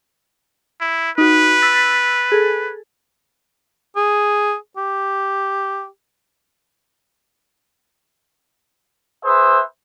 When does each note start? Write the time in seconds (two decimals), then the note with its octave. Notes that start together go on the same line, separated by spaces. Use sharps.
0.81 E4
1.18 D#4 F#4 B4
1.62 E6 A6 B6
2.32 G#4 A4
3.96 G#4
4.77 G4
9.25 G#4 B4 C5 E5